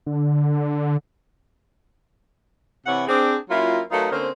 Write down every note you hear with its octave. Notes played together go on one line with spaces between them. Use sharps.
D3
C3 E3 E4 B4 C#5 F#5
C4 D4 G#4
F#3 A#3 C#4 E4 F4
F#3 A3 D#4 F4 A#4 B4
D3 A#3 C4 C#4 C5